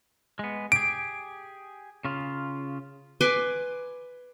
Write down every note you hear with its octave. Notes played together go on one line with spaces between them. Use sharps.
G#3 B3
G4 G#4 D7
C#3 F4
B4 G#5 C6 D6